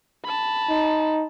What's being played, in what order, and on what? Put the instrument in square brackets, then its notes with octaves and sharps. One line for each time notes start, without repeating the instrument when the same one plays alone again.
[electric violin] A5 B5
[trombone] D#4